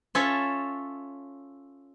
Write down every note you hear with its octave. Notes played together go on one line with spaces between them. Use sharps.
C#4 F4 A4 C#5 E5